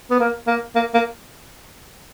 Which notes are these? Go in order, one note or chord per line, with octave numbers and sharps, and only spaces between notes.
B3
A#3
A#3
A#3
A#3